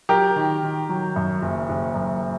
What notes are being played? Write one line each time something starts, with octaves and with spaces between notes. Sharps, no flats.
F#3 G4 A#4
D#3
D#3
F#3
F#2
F#1
F#1
F#2